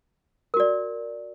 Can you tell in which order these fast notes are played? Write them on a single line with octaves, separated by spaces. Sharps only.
A#4 F#4 D5